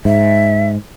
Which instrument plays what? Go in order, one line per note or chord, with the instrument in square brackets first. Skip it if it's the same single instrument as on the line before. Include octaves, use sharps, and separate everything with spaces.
[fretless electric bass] G#2 [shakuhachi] E5